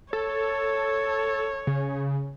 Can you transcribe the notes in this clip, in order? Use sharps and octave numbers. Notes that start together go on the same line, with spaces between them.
A4 C#5
C#3